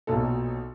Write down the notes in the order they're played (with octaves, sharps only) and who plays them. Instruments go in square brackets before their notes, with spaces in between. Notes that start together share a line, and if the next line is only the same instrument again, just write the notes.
[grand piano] B1 A#2 F#3 B3 D#4 A4